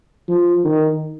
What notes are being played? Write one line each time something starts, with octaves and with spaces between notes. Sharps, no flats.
F3
D#3